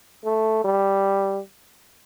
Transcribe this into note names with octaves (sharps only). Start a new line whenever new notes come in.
A3
G3